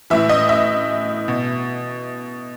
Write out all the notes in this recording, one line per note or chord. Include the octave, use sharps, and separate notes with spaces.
A2 E3 E5
D#5
E5
B2